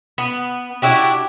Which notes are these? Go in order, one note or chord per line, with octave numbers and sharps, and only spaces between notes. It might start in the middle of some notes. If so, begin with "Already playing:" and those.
B3
D4 E4 F#4 G4